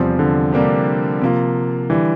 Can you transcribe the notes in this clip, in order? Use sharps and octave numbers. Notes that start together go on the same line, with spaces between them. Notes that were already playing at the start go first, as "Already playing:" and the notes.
Already playing: E2 C3 F3 G3 C4
D3
C3 G3 A#3 D4 G4
C3 F3 A#3 F4
D3 E3 G3